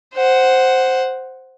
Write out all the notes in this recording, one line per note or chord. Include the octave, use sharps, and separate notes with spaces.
C5 F#5